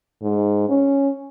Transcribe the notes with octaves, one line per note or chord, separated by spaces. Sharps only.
G#2
C#4